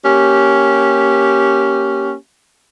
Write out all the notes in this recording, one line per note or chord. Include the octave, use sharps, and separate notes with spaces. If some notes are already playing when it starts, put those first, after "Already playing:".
A#3 C#4 G4